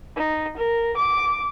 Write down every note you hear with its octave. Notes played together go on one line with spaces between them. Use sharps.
D#4
A#4
D6